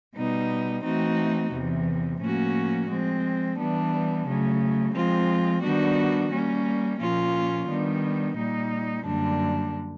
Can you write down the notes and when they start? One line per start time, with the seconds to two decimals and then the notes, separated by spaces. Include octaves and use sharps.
0.16 B2 G3 B3 D#4
0.84 E3 A3 C4 D#4 F#4
1.52 E2 C3 E3
2.21 A2 F3 A#3 C#4 F#4
2.90 F3 G#3 C4
3.58 E3 G3 B3 D4
4.27 C#3 F#3 A3
4.94 F3 G#3 C4 F4
5.63 D#3 G3 B3 D4 F#4
6.31 G3 A#3 C#4
7.00 A#2 F3 A#3 C#4 F4
7.68 D#3 G3 B3 D4
8.37 A#2 G3 A#3 D#4
9.05 F#2 D3 G3 A#3 D4